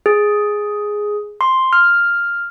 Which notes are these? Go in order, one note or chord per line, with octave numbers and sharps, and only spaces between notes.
G#4
C6
F6